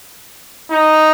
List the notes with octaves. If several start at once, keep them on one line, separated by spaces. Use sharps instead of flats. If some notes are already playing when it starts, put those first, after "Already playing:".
D#4